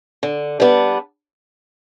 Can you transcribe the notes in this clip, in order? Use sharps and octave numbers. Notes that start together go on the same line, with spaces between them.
D3
G3 B3 D4